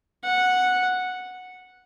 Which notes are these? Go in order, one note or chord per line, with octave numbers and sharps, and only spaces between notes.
F#5